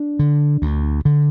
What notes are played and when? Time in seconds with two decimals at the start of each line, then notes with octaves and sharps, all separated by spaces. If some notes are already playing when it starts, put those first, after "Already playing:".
Already playing: D4
0.19 D3
0.62 D2
1.05 D3